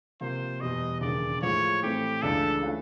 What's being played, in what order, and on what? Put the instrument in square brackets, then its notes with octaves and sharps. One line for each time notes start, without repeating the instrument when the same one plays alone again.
[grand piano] C3 F3 A#3 [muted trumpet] C5
[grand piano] E2 B2 G3 [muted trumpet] D#5
[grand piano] E1 D#2 C#3 [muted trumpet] D5
[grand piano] A2 F3 G#3 [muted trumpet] C#5
[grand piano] A2 E3 A3 C4 [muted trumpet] G4
[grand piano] C#2 C#3 E3 A3 D4 [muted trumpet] A4
[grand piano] E3 A3 C#4 F4